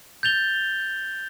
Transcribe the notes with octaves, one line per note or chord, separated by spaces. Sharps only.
G6 A6 F7 G7